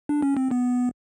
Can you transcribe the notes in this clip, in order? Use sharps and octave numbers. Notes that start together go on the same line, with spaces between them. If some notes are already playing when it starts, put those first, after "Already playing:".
D4
C#4
C4
B3